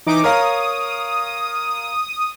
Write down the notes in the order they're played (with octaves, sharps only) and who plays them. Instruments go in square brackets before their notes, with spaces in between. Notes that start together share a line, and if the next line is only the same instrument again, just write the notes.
[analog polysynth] E3 D#4 D6
[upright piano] A#4 C#5 F5 [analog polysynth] D#6